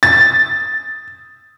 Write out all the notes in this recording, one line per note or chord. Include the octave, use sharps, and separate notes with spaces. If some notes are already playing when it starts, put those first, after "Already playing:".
A6